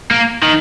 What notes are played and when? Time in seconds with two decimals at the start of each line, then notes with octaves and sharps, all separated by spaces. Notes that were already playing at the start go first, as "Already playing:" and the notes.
0.11 A#3
0.42 D#3